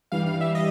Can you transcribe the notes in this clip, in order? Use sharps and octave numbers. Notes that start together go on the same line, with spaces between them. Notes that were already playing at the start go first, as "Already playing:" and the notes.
G2 E3 G3 F5
F5
E5
D#5